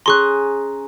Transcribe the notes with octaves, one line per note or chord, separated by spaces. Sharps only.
C#4 G#4 A#5 C6 C#6 F#6